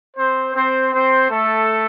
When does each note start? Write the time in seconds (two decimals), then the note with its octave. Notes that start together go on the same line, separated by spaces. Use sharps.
0.17 C4 C5
0.55 C4 C5
0.93 C4 C5
1.30 A3 A4